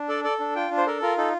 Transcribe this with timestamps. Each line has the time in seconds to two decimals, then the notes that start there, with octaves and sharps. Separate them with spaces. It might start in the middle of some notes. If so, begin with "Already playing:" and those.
Already playing: D4
0.09 A4 D5
0.24 A4 D5
0.40 D4
0.55 F4 G5
0.71 D4
0.77 C5
0.87 A4 A#4
1.02 F4 A#4
1.18 D#4 A4